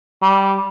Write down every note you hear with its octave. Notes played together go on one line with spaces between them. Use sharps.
G3